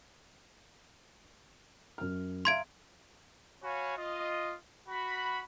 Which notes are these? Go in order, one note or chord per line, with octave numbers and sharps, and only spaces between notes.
F#2 F6
E5 F5 A#5 C6 G#6 D7
F#4 C#5 F5 G#5 B5
F4 D#5
F#4 B5